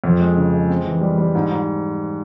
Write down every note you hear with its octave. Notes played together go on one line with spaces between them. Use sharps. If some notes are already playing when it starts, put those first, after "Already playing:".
F2
G#3
C#3
G#3
C4
E3
G3
G3
G#2
G#2